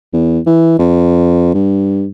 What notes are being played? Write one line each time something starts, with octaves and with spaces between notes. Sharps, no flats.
E2
E3
F2
G2